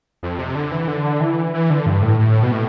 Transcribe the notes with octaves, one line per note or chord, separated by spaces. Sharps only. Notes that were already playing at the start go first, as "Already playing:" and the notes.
F2
C3
D3
E3
D3
E3
E3
D3
G2
A2
A2
B2
A2